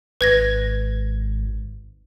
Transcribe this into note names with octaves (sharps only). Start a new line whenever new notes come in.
G#1 B4 G#6 A#6